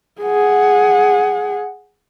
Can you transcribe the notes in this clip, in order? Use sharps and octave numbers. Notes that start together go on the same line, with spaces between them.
G#4 F#5